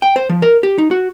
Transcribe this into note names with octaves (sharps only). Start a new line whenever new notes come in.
G5
C5
F3
A#4
G4
D#4
F#4